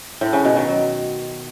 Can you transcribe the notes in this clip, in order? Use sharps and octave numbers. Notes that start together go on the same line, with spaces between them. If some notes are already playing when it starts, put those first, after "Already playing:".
A2
C#3
B2
D#3
F#3